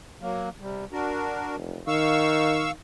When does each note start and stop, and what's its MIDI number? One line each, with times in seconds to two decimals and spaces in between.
0.21 0.49 54
0.21 0.49 58
0.61 0.85 48
0.61 0.85 55
0.92 1.56 62
0.92 1.56 66
0.92 1.56 70
1.56 1.79 29
1.87 2.72 51
1.87 2.71 77
1.87 2.71 85
1.87 2.71 88